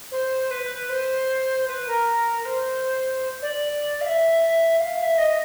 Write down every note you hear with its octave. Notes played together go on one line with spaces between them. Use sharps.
C5
B4
C5
B4
A#4
C5
D5
F5
E5
F5
F5
E5
D#5